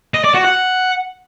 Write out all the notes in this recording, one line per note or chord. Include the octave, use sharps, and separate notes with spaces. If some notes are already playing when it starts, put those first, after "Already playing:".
D#5
D5
F#4
F#5